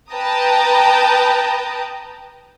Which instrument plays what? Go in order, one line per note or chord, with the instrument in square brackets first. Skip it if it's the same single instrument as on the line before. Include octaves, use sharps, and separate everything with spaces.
[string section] B4 G5 A5 A#5 D#6